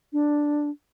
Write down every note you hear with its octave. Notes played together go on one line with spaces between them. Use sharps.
D4